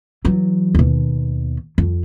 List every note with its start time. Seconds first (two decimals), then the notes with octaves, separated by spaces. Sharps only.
0.25 E3 F#3
0.75 D#2 B2
1.78 F2